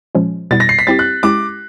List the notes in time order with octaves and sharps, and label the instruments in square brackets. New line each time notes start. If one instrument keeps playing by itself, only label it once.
[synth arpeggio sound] A#2 F3 G#3 C#4
[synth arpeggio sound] B2 G3 B3 E4 [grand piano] A6
[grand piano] A#6
C7
B6
[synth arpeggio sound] G3 C4 E4 G4 [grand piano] A6
[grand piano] F#6
[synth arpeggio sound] G#3 C#4 E4 G4 [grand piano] D6